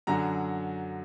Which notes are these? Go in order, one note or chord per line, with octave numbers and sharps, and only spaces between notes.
F#2 D3 F#3 A#5